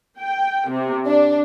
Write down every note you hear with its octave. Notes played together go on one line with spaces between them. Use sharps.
G5
C3
D4